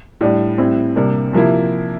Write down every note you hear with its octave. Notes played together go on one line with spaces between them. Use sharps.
A2 G3 D4
A2 G3 C4 E4
C3 G3 A#3 D4
C3 F3 A#3 E4